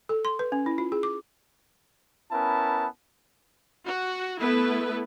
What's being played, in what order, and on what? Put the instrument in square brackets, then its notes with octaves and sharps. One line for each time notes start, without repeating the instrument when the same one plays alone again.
[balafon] A4
C6
B4
C#4
E4
F4
G#4
D6
[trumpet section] B3 C#4 E4 A#4 A5
[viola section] F#4
A3 B3 E4 B4